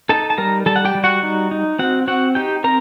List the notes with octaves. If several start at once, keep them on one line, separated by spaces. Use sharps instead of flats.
D#4 A4 A5
A5
G3 A#4 A#5
G3 A4 A5
F#5
G4 G5
G3
F#4 F#5
D#4
D#4
C4 F#4 F#5
C4 F#4 F#5
D#4 G4 G5
C4 A#4 A#5